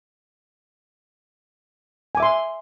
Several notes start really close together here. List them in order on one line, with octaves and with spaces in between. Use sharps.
G#5 D6 E5 C6